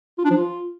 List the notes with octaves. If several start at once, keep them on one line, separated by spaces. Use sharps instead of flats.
F4
D4
F3
F4